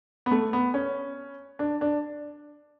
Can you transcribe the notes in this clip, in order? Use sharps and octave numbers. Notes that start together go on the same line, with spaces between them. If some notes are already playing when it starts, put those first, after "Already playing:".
B3
A3
B3
C#4
D4
D4